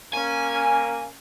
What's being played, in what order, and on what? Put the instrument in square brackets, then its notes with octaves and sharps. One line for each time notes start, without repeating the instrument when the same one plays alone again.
[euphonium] A#3 [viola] C#4 [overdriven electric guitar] G#5